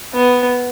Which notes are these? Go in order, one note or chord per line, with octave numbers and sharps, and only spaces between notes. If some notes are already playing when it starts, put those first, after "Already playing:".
B3